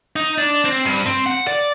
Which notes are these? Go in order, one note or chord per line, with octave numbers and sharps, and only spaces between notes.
D#4
D4
C4
G2
C4
F#5
D5